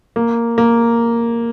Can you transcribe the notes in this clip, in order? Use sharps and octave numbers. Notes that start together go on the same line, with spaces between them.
A#3
A#3